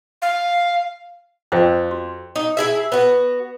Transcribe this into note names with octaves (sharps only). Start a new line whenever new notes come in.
F5
F2 C5 F5 G5
F#4
D#4
E4 G#4 E5
B3 F#4